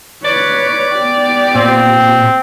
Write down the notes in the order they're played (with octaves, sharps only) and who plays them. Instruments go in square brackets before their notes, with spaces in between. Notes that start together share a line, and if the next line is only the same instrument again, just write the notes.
[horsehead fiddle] B4 C#5 [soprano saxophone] D5
[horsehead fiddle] B3 G4
[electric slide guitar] A#2 [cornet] C4